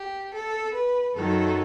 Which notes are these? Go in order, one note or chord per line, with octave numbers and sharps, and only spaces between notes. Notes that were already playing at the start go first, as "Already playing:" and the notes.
Already playing: G4
A4
B4
F#2 D#3 F#3 A4